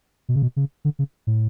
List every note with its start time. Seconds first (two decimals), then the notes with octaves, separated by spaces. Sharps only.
0.29 B2
0.36 C#3
0.42 B2
0.56 C#3
0.85 D3
0.99 C#3
1.27 A2